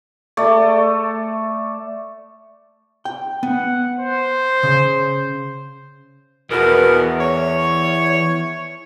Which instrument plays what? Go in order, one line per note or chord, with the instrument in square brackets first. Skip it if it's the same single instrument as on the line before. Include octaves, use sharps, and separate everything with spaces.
[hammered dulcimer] A3 D5
[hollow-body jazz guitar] G5
[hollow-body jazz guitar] B3 [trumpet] F#5
[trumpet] C5
[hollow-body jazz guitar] C#3
[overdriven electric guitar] E2 [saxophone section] B2 B3 A#4
[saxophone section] C#5